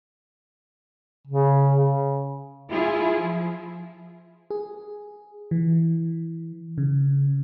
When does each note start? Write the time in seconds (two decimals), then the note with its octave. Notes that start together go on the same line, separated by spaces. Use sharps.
1.27 C#3
2.71 E4 F4 G#4
3.17 F3
4.50 G#4
5.51 E3
6.78 C#3